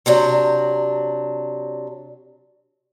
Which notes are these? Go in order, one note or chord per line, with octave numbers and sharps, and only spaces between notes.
C3 F#3 D4